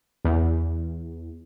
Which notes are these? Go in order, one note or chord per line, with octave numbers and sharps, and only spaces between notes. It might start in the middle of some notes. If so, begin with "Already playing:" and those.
E2